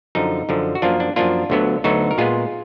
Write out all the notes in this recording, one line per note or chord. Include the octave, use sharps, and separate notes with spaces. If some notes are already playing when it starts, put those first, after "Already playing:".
F#2 D3 F3 D#4
F#2 D3 F3
F#4
F#2 F3 A#3 D4 F4
D4
F#2 F3 A#3 D4 F4
D2 D3 F#3 B3
D2 D3 F#3 B3 D#4 F#4
A#4
A#2 G#3 B3 F4 G#4